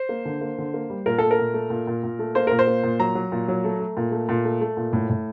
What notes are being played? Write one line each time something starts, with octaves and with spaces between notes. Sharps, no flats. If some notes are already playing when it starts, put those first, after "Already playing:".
Already playing: C5
A#3
D3
A#3
D3
A#3
G3
A#2 A#4
A3 A4
A#4
A#2
A3
A#2
A#2
A#2
A3
A#3 C5
A#2 A#4
C5
A#3
A#2
F#3 A#5
F#3
A#2
F#3
A3
A3
A#2
A3
A#2
A3
A3
A#2
A2
A2